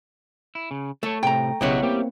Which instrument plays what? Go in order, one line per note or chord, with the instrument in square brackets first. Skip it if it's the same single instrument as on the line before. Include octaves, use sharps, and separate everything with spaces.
[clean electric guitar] E4
C#3
[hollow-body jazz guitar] A3 [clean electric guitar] A4 C#5
[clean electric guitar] A2 C3 [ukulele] G5 A#5
[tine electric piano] B1 C#3 [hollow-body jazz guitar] B3 E4 C#5 [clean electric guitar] G4 D#5 F#5
[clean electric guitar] G3 G4 [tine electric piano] A#3 C4